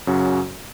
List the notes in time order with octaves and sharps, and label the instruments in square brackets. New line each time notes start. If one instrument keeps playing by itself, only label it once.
[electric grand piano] F#2 C#3 F#3 C#4 F#4